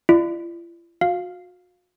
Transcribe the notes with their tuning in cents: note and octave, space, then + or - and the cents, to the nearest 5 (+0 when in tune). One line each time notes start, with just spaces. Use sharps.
F4 -45 D5 +35
F#4 -40 F5 +0